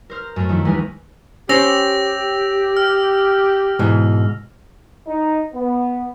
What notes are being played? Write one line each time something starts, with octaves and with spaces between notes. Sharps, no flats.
A#4 C5 F6
F#2 A3
D#3 F3 E4
D#2 E3 G3 G#3 A#4 B4
C#4 G4 C5 E6 A#6 F7
F6
G#2 B2 E3
D#4
B3